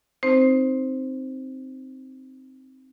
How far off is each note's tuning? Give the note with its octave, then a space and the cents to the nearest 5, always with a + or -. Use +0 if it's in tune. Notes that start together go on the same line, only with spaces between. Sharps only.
C4 +0 D#4 +0 C5 +0